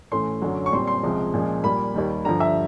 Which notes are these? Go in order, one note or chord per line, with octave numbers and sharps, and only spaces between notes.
A2 E3 A3 C#4 C6
F#2 D3 F#3
C#6
A#2 G3 C4 C6
C6
C#2 C3 F3 G#3
A#2 F3 G#3 C#4
A#2 G3 A#3 B5
D#2 D#3 G3
G2 D3 F3 A#5
E5